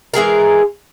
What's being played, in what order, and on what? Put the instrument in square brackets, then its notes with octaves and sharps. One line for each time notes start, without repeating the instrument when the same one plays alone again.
[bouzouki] E3 G#3 G#4 A#4